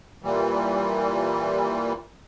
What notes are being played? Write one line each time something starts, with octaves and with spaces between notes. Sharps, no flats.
A#2 E3 G3